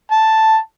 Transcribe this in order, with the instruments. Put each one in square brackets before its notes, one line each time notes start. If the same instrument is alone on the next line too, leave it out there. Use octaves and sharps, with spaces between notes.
[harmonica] A5